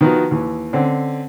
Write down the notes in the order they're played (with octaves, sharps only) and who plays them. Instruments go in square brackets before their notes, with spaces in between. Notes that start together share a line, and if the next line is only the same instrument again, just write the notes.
[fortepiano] D#3 F3 B3 D#4 F#4
D#2 E3
D3 C4 C#4